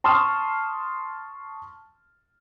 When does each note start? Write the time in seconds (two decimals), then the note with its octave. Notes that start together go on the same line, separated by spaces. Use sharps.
0.04 A5 C6 C#6 D#6 F6 E7